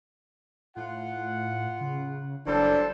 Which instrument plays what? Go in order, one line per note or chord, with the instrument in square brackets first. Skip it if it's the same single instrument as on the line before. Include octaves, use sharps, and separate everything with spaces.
[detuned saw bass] A2 [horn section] F4 F#5
[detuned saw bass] C#3
[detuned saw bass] F#1 [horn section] E3 F#3 G3 [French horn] D4 [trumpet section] A4 C5